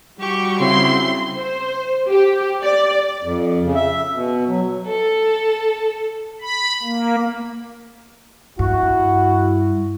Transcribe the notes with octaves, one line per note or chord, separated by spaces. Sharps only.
G3 F#4 G4 C#6
C#3 C4 E4 C6
C5
G4
D5
F2
C#3
E5
B2
F#3
A4
B5
A#3
G2 E4 F#4